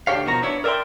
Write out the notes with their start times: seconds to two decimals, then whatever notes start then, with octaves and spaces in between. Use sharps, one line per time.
0.07 D2 D4 G4 C#5 F5
0.25 B2 D#3 F3 F#4 A#5
0.42 B3 D4 E4 C#5
0.64 A#4 D5 E5 F5 G5 C6